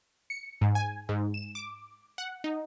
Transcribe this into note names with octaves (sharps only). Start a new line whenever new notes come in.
C#7
G#2
G#5
G#2
E7
D6
F#5
D#4